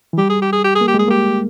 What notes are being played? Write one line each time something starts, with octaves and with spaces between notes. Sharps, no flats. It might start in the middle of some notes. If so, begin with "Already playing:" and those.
E3
G3 G4
G#4
G4
G#4
G4
G#4
A#3
G4
G#3 G#4
A#3 G4